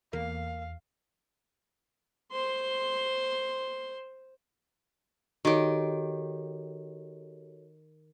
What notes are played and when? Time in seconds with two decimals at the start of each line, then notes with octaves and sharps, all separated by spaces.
0.13 E2 A#3 F5
2.32 C5 C6
5.45 D#3 F#4 G4 A4 C#5